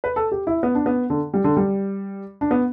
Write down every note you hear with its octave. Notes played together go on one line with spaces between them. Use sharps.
B4
A4
G4
E4
B3
D4
B3
D3
G3
D3
G3
D4
B3